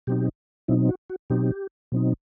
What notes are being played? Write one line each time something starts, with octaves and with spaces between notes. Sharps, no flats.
B2 F#3 C4 D#4 G4
B2 F#3 C4 D#4 E4
F#4
F#4
B2 F#3 C4 D#4 G4
B2 F#3 C4 D#4